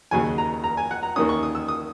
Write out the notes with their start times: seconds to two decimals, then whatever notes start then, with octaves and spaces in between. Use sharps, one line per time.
0.11 D#2 C#3 F#3 G#5
0.38 A#5
0.64 A#5
0.77 G#5
0.91 F#5
1.03 A#5
1.16 D#2 D#3 A#3 C#4 D#6
1.29 C#6
1.43 D#6
1.55 E6
1.68 D#6